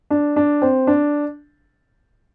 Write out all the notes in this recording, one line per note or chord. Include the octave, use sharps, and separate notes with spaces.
D4
D4
C4
D4